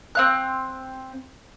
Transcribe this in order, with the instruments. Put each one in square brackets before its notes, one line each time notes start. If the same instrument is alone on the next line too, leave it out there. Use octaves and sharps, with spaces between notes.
[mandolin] C4 F5 F#6